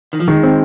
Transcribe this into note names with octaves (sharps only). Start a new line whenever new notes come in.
D#3
F3
D#3 G#3
C4